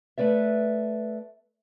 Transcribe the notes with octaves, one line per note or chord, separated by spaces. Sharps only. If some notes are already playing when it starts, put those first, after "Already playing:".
A3 B4 D5 E5